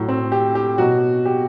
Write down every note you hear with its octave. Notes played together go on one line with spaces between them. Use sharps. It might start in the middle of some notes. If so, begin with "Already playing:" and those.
Already playing: A2 F#3
C4
G4
G4
B2 F#3 F#4
G4